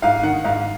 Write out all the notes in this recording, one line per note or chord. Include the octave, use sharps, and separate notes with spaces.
G#2 F5
D#3 F#5
G#2 F5